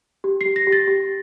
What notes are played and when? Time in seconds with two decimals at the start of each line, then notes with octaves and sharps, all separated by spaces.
0.24 G4
0.41 C7
0.46 G4
0.56 A#6
0.67 G4
0.72 A6
0.88 G4